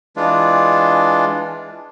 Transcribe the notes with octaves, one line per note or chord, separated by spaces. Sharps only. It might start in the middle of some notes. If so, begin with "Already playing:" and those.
E3 G#3 D4 F4